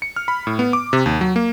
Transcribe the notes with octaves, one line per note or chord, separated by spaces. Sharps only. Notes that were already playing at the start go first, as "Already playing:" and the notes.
C#7
F6
B5
A2
B3
D6
C3
D#2
F#3
A#3